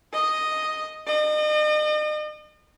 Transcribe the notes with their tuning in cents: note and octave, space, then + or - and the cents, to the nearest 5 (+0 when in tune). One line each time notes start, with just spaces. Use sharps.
D#5 +0
D#5 -40